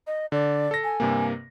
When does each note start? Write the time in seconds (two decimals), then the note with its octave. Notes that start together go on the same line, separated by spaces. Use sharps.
0.07 D#5
0.32 D3 D5
0.71 A4 A#6
0.84 G#5
1.00 G2 C3 A#3